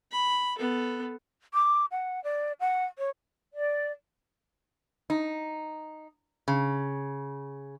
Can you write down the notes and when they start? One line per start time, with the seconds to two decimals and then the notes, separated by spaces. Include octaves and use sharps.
0.11 B5
0.58 B3 A4
1.54 D6
1.91 F#5
2.24 D5
2.60 F#5
2.98 C#5
3.53 D5
5.10 D#4
6.48 C#3